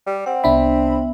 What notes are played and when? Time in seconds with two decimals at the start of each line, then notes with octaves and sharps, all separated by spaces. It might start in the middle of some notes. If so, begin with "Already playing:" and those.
0.06 G3
0.26 C4 F#5
0.44 C2 B3 D4 E5 B5